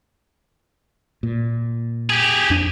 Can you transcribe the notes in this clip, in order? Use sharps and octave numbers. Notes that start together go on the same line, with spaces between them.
A#2
G4 G#4
F2 D4